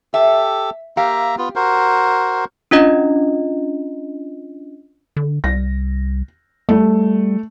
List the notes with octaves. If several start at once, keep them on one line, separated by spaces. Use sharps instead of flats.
G4 A4 E5
A#3 G4 E5 F5 A#5
B3 F4
F#4 A#4 C5
C#4 D4 F4 D#5
D3
C2 A#6
G3 A3